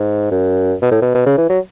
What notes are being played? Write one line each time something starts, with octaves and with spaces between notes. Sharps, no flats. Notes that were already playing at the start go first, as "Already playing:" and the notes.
Already playing: G#2
F#2
B2
A2
B2
B2
C#3
E3
F#3